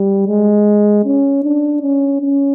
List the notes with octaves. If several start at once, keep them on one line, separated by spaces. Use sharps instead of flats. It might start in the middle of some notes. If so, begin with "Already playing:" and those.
Already playing: G3
G#3
C#4
D4
C#4
C#4